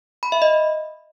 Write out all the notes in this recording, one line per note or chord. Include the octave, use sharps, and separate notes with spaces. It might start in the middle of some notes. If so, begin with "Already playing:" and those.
B5
E5
D#5